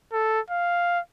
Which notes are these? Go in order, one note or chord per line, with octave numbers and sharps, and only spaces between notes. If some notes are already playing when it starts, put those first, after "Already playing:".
A4
F5